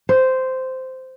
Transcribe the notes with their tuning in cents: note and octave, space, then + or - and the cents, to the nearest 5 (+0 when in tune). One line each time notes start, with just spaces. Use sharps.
C5 -10